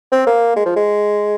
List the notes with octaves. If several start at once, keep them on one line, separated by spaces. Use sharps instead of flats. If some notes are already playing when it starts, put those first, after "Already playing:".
C4
A#3
G#3
F3
G#3